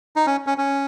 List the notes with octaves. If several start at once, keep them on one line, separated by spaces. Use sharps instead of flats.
D#4
C#4
C#4
C#4